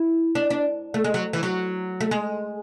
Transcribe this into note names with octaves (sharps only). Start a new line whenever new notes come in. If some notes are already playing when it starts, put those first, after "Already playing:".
Already playing: E4
D4
D4
A3
G#3
F#3
E3
F#3
A3
G#3